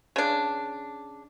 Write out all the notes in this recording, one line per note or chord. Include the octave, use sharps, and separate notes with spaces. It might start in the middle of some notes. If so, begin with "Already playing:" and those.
C#3 D4